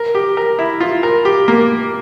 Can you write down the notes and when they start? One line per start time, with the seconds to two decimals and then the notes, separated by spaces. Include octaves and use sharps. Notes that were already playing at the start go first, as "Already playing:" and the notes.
Already playing: A#4
0.15 G4
0.37 A#4
0.59 E4
0.80 F4
1.03 A#4
1.25 G4
1.48 A#3